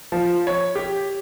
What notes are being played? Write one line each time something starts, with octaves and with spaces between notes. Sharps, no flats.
F3
C#5
G4